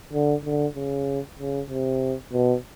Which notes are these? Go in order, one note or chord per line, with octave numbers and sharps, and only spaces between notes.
D3
D3
C#3
C#3
C3
B2